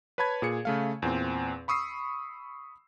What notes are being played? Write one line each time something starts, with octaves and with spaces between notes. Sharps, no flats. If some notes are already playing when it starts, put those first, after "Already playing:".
B4 C#5 A5 B5 G#6
A#2 G#4 C#7
C#3 A3 F5
E2 A#2 C4
B5 C#6 D#6 E6 C7